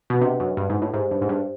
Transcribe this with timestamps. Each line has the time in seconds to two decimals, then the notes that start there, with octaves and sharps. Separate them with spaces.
0.10 B2
0.21 C3 D4 F#4 B4 D#5 F#5
0.40 F#2
0.57 G2
0.69 G#2
0.82 A2
0.93 G#2 G4 C5 E5
1.11 G2
1.21 G#2
1.29 G2